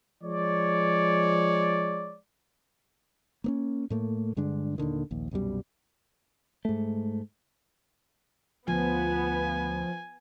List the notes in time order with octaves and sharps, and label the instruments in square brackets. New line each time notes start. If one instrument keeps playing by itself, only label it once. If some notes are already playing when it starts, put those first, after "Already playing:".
[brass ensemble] F3 G#3 C#5 D5
[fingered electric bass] A#3 B3 C#4
A2 A3 A#3
G2 D3 G#3 D4
D#2 A#2 D3 D#3
A#1 D#2
C2 F#2 B2 G3
G#2 A3
[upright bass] D2 [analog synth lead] F3 [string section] B3 [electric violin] G#5